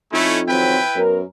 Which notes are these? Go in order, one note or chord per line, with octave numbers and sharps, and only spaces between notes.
F2 A3 C#4 D#4 E4
D#3 F#3 C4 E4 B4 G5
F#2 B3 C#4 A#4